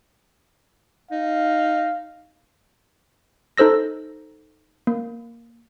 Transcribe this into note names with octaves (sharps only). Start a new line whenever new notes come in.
D#4 F5
D#4 A4 C5 E6 A#6
A#3